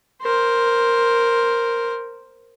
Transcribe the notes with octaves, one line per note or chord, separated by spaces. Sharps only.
A#4 C5